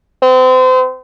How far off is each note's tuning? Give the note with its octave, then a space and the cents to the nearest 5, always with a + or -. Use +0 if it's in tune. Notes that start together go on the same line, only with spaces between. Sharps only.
C4 -35